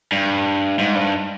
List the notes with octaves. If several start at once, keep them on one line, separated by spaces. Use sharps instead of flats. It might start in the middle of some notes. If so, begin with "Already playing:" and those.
G2
G#2
G2